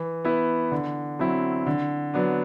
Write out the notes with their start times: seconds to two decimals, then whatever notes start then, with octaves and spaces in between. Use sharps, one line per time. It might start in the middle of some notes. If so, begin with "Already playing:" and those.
Already playing: E3
0.25 B3 E4
0.72 D3
1.19 F#3 C4 E4
1.67 D3
2.14 F#3 B3 D4